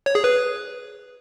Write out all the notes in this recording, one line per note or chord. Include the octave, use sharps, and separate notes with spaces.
C#5
G#4
B4